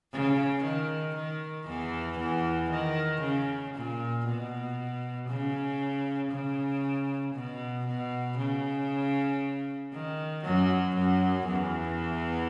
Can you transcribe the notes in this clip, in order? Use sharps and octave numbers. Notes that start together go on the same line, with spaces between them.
C#3
D#3
D#3
E2 E3
E2 E3
D#3
C#3
A#2
B2
C#3
C#3
B2
B2
C#3
D#3
F#2 F#3
F#2 F#3
E2 E3